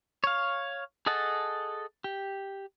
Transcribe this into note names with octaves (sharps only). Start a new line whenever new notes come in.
C#5 F5
G#4 A4 D#5 F#5 A5
G4